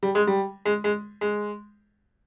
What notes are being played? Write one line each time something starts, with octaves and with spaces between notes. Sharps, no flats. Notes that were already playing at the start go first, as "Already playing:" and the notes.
G3
G#3
G3
G#3
G#3
G#3